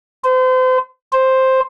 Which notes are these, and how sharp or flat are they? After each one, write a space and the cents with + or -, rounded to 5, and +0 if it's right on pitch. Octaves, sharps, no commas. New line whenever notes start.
C5 -35
C5 +5